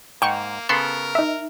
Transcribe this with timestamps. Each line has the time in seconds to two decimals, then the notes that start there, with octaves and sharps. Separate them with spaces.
0.22 G#2 A#3 G5 C#6
0.69 C#3 B3 A4 A#4 C6
1.15 D#4 E5